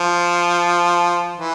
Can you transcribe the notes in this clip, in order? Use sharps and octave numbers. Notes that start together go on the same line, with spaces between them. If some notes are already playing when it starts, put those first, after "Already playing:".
Already playing: F3
E3